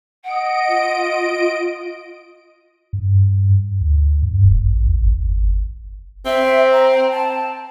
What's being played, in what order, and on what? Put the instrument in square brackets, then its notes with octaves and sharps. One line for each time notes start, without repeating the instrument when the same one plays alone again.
[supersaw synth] D#5 D7 [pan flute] F#5
[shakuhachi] F4
[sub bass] G2
D2
G2
E1
A1
E2
G1
[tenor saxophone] C4 [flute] E5
[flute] A#5
G5
A5